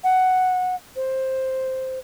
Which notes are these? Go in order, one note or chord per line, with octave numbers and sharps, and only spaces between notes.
F#5
C5